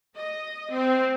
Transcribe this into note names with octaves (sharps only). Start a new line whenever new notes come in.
D#5
C4